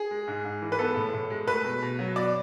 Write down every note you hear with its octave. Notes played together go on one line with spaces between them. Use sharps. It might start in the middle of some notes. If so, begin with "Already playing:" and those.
Already playing: G#4
G#3
G#2
G#2
E3
B4
B3 A4
A2
A2
G#3
A3 B4
B2
B2
F#3
B2 D5